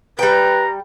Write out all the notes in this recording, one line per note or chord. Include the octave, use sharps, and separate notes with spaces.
G3 B4 G5 A#5